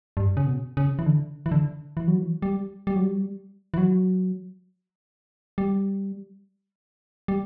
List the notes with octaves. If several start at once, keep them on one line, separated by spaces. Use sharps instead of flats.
G2
C#3
B2
C#3
E3
D3
E3
D3
E3
F#3
E3
G3
G3
F#3
G3
E3
F#3
G3
G3